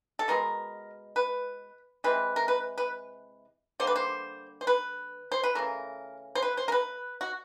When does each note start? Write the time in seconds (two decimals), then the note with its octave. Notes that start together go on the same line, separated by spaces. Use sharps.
0.19 A4
0.28 B2 G#3 B3 A#4
1.16 B4
2.04 C3 E3 G#3 B4
2.36 A#4
2.48 B4
2.78 B4
3.80 D3 G3 A#3 C5
3.87 B4
3.96 C5
4.61 C5
4.67 B4
5.32 C5
5.43 B4
5.55 C#3 E3 A3 A#4
6.35 C5
6.43 B4
6.57 C5
6.68 A#4
6.72 B4
7.21 F#4